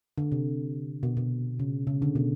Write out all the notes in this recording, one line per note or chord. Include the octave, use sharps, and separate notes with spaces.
D3
C3
B2
B2
C#3
C#3
D3
B2